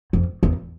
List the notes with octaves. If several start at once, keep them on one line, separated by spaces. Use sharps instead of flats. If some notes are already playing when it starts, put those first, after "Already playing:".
F2
E2